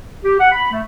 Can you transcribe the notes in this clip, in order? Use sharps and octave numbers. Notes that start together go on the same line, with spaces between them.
G4
F#5
B5
A3